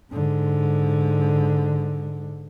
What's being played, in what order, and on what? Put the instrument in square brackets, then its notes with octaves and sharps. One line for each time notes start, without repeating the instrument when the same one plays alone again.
[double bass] G#2 D3